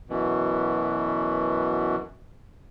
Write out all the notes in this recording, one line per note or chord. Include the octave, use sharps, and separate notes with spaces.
F#2 B2 E3